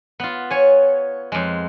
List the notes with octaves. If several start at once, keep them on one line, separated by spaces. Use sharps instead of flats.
B3 F4
C#5 G#5
F2 G#3